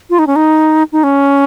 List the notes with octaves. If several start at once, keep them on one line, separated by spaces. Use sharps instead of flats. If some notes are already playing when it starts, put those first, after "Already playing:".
F4
D#4
C#4
D#4
D#4
C#4